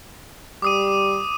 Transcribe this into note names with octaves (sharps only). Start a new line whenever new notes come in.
G3 D6 D#6 D#7